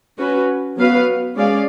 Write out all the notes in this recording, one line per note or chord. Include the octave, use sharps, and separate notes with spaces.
C#4 F#4 B4
F#3 B3 F#4 B4 F5
G#3 C#4 G#4 D5 F5